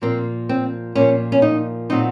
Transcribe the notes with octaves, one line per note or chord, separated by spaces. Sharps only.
A#2 F3 A#3 C4
C4
A#2 F3 A#3 C#4
C#4
D#4
A#2 F#3 C4 D#4